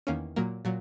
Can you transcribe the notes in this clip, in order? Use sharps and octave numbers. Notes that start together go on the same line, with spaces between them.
E2 D#3 A#3 C#4
A#2 F#3 A#3
A#2 F#3